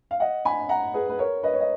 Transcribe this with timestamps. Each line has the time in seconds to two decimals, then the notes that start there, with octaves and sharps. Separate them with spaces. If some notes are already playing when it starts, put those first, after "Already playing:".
0.11 F5
0.20 D#5 F#5
0.45 G#5 B5
0.69 F#5 A#5
0.94 G#4 B4
1.09 B4
1.19 A#4 C#5
1.43 B4 D#5
1.53 C#5
1.61 D#5